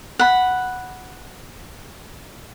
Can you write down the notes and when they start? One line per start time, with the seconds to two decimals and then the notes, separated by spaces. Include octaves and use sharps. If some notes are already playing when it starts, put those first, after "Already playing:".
0.19 F#5 B5